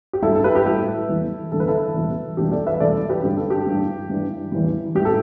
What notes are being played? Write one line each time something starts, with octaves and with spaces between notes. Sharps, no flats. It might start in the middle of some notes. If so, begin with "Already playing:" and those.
G4
G2 G3 E4 A4
A4
G4 B4
G4
A2 G3 E4 A4
E2 E3 G3
E2 D3 G3 A4
B4
E4 A4
E2 B2 G3
E2 B2 G3 D4 G4
A4 D5
B4 E5
E2 B2 G3 A4 D5
G4 B4
G2 D3 G3 G4
A4
D4 G4
G2 E3 G3
G2 E3 G3
E2 E3 G3
A2 E3 G3 G4
A4